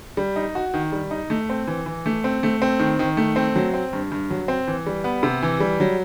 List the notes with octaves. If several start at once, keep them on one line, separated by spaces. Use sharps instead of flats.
G3
D#4
F#4
D#3
G3
D#4
A3
C4
E3
E3
A3
C4
A3
C4
D#3
D#3
A3
C4
F#3
C4
G2
G2
F#3
C4
E3
G3
B3
C3
E3
G3
F#3